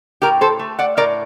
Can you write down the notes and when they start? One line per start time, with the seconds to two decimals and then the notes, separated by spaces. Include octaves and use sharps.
0.22 A2 G4 A#4
0.41 A4 C5
0.59 A3
0.79 D5 F#5
0.97 A2 A#4 D5